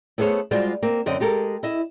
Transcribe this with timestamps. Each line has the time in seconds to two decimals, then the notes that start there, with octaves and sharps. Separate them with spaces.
0.18 A3 B3 G#4 C5 C#5
0.51 G3 G#3 F4 F#4 C5 D5
0.83 A#3 C4
1.06 F#2 D3 C4 D#5
1.20 G#3 G4 A4 A#4
1.63 E4 D#5 E5